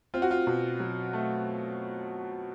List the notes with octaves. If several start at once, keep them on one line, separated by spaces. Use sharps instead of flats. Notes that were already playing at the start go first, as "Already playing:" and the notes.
C4 F4
F#4
F4
B2
F#3
A3